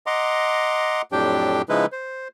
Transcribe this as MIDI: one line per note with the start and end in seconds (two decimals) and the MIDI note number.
0.06 1.02 75
0.06 1.02 78
0.06 1.02 82
0.06 1.02 84
0.06 1.02 86
1.12 1.62 41
1.12 1.62 45
1.12 1.62 54
1.12 1.62 62
1.12 1.62 67
1.12 1.62 79
1.69 1.86 49
1.69 1.86 53
1.69 1.86 56
1.69 1.86 63
1.69 1.86 64
1.69 1.86 71
1.92 2.28 72